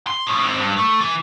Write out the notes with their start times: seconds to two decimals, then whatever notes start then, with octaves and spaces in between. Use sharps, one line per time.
0.07 C6
0.27 A2 F3
0.43 G#2 C4
0.59 G2
0.77 A3
1.01 E3